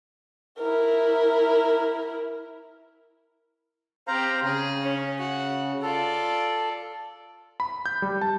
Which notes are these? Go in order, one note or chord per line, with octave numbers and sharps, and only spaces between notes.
E4 A#4
C4 G4 C5 F5 A#5
C#3 G#4
C#4
F#4
F4 A4 D5
B5
G6
G3
A5